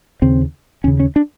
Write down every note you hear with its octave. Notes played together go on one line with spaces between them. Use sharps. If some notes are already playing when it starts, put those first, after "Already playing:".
D#2 C#3 C4
D#2 C#3 C#4
C#4
D4